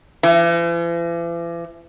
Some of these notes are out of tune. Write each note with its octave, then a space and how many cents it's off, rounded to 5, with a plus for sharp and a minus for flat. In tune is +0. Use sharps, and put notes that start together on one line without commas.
E3 +45